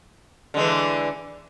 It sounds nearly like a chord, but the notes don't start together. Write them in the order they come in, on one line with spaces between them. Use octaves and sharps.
D3 G#3 E3